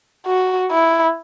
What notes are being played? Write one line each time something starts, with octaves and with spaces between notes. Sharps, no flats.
F#4
E4